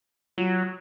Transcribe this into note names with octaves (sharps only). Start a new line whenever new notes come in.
F#3 F4